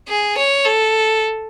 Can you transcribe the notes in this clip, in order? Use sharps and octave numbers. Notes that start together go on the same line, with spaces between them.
G#4
C#5
A4